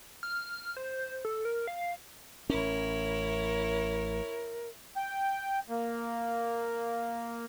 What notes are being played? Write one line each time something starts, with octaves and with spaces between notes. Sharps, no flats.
F6
C5
A4
A#4
F5
A1 C#4 E4 A#4 C#5
G5
A#3